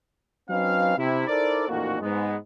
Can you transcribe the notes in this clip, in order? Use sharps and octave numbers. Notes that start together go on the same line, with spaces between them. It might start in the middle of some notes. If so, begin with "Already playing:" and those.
F#3 C4 C#4 D#4 B4 F5
C3 E4
D#4 E4 A4 A#4 C5 D5
A1 F2 A#2 A#3 D#4 F#4
G#2 G#3 B3